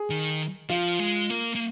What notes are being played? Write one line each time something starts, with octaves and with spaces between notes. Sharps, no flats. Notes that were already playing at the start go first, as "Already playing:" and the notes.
Already playing: G#4
D#3
F3 F4
G#3
A#3
A#3